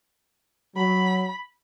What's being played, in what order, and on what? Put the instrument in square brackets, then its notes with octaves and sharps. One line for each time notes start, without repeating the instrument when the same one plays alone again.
[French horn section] F#3 [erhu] B5